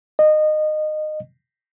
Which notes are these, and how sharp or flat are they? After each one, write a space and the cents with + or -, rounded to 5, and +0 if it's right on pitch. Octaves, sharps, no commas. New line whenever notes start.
D#5 -20